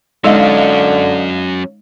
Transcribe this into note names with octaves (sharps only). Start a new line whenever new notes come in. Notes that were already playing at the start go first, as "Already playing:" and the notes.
D3 F#3 G#3 C#4 D#4 D#5 F5